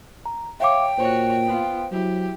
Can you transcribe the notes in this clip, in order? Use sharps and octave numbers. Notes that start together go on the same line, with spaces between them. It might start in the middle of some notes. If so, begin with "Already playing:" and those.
A#5
C#5 E5 F5 G5 D6
A#2 F#4 C5 C#5
B3 F4
F#3 E4 G4